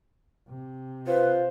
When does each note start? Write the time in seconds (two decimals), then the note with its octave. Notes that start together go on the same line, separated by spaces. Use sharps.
0.48 C3
1.07 F4 B4 C5